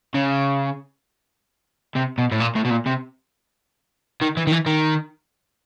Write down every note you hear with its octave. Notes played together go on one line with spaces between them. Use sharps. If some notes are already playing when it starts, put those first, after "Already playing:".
C#3
C3
B2
A2
A#2
A2
B2
A#2
C3
D#3
E3
D#3
E3
D#3